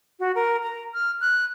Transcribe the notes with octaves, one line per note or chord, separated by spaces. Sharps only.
F#4
A#4
A#5
F6
F#6